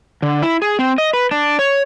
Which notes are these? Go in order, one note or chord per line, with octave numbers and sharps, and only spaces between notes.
D3
E4
G#4
C4
D#5
B4
D4
C#5